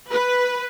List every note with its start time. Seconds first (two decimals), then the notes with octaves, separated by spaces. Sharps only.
0.10 B4